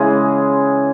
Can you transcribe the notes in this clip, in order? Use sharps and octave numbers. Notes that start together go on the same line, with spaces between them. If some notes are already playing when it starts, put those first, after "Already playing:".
Already playing: C#3 E3 G#3 G#4